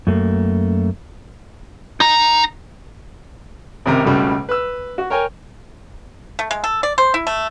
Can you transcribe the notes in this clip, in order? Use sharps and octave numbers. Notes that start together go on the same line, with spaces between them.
F#2 A3 A#3
D#4 A#5
G#1 C#2 C3 A#4 A#5
C#2 B2 G3 A3
B4 E6
F#4
A#4 C#5 G5 G#5
A3
G#3
A4
D5
C5
E4
A3